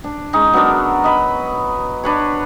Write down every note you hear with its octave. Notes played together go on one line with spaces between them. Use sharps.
D4
G#3 C#4 D#4
F#3 B3 D4 A#4
D#5 B5
D4 B4 C#5